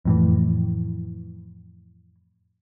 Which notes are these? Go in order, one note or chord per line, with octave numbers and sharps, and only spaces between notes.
F2 A2 E3